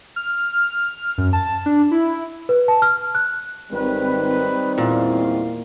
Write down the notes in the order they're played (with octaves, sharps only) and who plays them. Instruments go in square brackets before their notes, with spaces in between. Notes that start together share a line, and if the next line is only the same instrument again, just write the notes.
[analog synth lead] F6
F#2
A5
D4
E4
[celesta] B4
A5
F6
F#6
[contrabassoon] G#1 [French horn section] D#3 G3 C4 [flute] B4
[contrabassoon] E2 [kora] A#2 [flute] F5